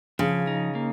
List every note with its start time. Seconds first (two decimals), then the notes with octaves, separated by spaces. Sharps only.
0.19 C#3 F3
0.47 D#4
0.75 A#3